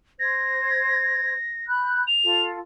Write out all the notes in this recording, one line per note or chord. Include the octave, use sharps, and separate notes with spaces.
C5 G#6 A#6
B5 F#6 G6
F7
F4 A4